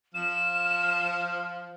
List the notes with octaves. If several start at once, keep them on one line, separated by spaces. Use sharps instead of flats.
F3 F6 E7